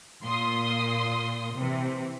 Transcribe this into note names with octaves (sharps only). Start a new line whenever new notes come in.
A#2 C6 D#6
C3 E3